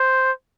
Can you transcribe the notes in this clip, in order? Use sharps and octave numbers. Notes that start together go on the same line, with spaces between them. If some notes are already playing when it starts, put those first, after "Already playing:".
Already playing: C5